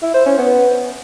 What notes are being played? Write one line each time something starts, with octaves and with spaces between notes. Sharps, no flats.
E4
C5
C#4
B3